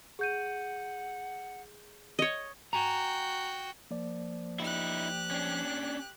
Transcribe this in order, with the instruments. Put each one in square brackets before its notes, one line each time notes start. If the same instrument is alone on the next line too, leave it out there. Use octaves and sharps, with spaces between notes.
[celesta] G#4 G6 D#7 [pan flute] F#5
[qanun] C#5 D#5
[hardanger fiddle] F#4 G5 [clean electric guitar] G#5 A#5
[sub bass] F3 [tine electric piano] A#3 D5
[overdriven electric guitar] D#4 E4 [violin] G4 F#6
[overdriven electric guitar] C#4 D4